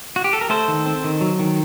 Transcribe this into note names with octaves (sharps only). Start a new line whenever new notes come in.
F#4
G4
A4
A#4
A3 A4 C5
D#3
C4
D#3
F#3
D#3